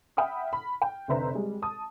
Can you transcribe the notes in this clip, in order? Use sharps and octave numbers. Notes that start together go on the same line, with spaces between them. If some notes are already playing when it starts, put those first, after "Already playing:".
E5 F#5 G5 B5 D#6 F6
B5
G5
F1 D3 B4 C5 E5 A#5
G3 G#3
A5 D#6